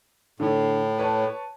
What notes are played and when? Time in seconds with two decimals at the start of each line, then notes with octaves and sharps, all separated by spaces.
0.40 A2 D3
0.98 B4 C#5 A5